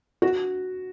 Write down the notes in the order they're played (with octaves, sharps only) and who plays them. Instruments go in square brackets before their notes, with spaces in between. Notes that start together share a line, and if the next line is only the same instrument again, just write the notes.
[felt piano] F#4